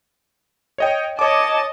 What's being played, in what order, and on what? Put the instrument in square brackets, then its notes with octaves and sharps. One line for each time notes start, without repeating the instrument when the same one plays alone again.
[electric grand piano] C#5 D#5 G5
[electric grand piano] C#5 D6 [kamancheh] D#5 A5